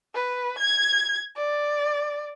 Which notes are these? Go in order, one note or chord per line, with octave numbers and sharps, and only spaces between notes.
B4
G#6
D5